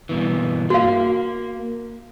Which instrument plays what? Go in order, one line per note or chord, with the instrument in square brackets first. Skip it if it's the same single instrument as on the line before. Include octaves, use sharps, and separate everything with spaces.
[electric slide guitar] G2 B2 E3
[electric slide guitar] A#3 [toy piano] F#4 F5